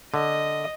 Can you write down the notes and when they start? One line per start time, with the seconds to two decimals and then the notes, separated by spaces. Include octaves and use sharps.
0.13 D3 D#5